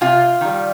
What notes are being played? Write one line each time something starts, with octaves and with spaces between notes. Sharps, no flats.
C3 F4
D#3 G3